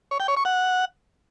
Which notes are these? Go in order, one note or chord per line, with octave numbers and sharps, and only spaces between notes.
C#5
G5
C#5
C#6
F#5